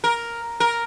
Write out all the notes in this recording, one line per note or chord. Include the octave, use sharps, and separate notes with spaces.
A#4
A#4